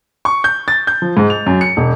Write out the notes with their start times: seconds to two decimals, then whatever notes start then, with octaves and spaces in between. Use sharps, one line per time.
0.25 C#6
0.44 G6
0.68 A6
0.87 G6
1.02 F3
1.17 G#2
1.30 F7
1.46 F#2
1.61 C#7
1.77 E1